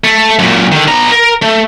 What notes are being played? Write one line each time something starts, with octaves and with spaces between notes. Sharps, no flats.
A3
F#2 A#2
D3 D#3
B3 A#5
A#4
A3